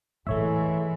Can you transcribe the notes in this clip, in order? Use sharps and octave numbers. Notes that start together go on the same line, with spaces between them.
A2 E3 G#3 A3 D4 C#5 E5